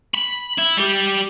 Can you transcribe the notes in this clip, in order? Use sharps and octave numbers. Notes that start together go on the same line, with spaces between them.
B5
E4
G3 G4